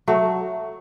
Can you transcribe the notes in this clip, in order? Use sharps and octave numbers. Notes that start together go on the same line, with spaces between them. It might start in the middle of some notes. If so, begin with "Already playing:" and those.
F#3 A3